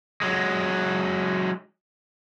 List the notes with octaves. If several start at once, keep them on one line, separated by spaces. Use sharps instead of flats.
F#3 G#3